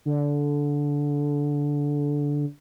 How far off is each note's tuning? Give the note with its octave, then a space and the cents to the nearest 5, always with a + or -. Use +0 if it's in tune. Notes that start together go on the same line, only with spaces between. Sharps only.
D3 -15